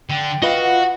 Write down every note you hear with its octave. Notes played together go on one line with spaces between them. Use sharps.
D3 G5
F4 F#4 B4 D#5 F5
F#5